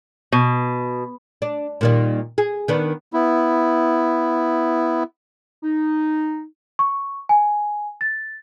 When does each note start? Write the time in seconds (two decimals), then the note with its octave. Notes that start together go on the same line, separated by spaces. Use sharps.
0.32 B2
1.42 D4
1.81 A#2 D#3 G3
2.38 G#4
2.68 D#3 B3 D4
3.13 B3 E4
5.63 D#4
6.79 C#6
7.29 G#5
8.01 A6